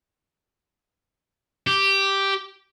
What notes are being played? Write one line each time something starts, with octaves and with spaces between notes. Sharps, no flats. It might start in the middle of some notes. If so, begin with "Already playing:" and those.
G4